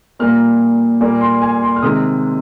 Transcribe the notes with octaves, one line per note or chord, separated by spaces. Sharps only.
A#2 G3 A#3 F6
A#2 G3 A#3
C6
G#5
C6
F6
C3 D#3 G#3 D#6